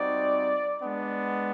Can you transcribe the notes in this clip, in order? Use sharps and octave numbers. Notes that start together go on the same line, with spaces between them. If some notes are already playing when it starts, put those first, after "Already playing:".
Already playing: G3 C4 D#4 F#4 D5
G#3 B3 D4